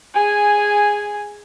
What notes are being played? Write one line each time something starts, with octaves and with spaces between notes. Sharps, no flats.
G#4 G#5